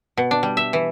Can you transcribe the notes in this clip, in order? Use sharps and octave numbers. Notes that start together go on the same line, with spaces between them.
B2
D4
G3
E5
E3